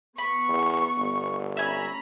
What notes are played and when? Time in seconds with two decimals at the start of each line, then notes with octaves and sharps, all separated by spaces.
0.18 B3 B5 C#6
0.48 E2
0.97 G1
1.57 C#4 E5 G#5 A#5 B5